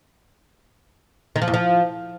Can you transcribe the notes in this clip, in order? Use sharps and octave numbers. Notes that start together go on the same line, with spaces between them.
D#3
F3
E2
F3